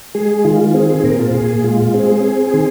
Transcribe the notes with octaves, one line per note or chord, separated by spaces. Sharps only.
G#3 G#4
D#3 F4
C4 G#4
G#4
A#2 A#4
F4
A#2 G#4
G#3 F4
C4 G#4
C4
D#3